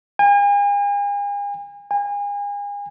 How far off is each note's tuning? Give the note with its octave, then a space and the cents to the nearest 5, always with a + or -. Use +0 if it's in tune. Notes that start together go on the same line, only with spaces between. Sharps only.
G#5 -40
G#5 -35